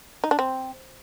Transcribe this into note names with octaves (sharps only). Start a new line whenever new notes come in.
D#4
D4
C4